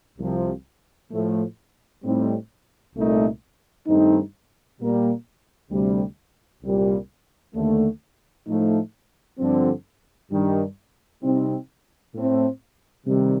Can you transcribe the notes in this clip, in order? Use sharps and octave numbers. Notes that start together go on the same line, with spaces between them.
C2 C3 F3 C4
A2 F3 A3
A2 G3 C4 D#4
C2 A#2 A3 D#4
G2 D#3 A3 C4 D#4
A#2 G3 A#3
D2 C3 G3
C2 A#2 G3
D#2 D3 A3
A2 F3 A3 D#4
G2 D3 F3 C4
G2 D#3 G3 D4
C3 G3 C4 D#4
A2 A3 C4
C3 D#3 G3